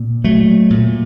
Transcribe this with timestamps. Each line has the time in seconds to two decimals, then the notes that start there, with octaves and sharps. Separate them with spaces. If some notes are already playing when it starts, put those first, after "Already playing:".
Already playing: A#2
0.24 F#3 A3
0.70 A#2